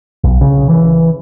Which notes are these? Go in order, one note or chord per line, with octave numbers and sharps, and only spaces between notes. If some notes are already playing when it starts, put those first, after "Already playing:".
B1
C#3
E3